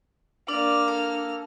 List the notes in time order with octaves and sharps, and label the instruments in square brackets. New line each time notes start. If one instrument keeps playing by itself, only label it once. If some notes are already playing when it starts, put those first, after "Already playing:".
[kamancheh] A#3 F6 [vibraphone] D4 [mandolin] D5
[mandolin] A4